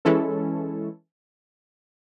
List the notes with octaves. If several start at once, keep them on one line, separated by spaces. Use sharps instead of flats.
E3 G#3 C#4 E4 A4